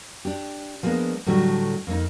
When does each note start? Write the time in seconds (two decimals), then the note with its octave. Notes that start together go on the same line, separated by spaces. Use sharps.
0.25 D4 G4
0.83 F3 G3 G#3 A#3 B3 D4
1.26 A2 D3 F#3 G3 A3
1.87 F2 A#3 C#4 D#4